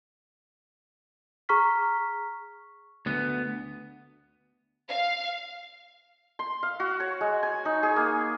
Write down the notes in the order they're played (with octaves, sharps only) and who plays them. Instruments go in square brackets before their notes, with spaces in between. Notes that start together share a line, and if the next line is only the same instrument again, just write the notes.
[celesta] G#4 A#5 C#6 F6 B6
[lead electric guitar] D2 B3
[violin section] F5
[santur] C6
F5
F#4
C#5
G#3
G#5
D#4
G#4
A#3